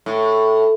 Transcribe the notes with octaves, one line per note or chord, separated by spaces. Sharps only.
A2